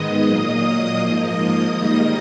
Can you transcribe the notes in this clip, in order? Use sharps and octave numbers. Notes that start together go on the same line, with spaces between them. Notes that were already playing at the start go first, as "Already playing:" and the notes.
Already playing: G#2 D#3 G#3 B3 D#5 D#6
A#2 F#3 A#3
G#2 F3 A#3
G#2 D#3 G3 A#3